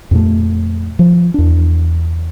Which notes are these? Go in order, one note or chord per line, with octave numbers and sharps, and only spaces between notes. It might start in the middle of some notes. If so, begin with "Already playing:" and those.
F2 A#2 A3
F3
E2 D4